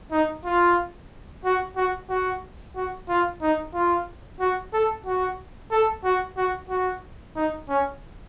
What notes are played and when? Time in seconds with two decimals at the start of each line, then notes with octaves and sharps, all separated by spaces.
0.12 D#4
0.45 F4
1.45 F#4
1.77 F#4
2.10 F#4
2.76 F#4
3.09 F4
3.42 D#4
3.74 F4
4.41 F#4
4.73 A4
5.06 F#4
5.72 A4
6.04 F#4
6.37 F#4
6.69 F#4
7.36 D#4
7.69 C#4